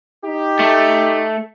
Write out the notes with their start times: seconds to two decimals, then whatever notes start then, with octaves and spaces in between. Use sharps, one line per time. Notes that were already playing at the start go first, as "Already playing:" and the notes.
0.25 D#4 G4
0.60 A3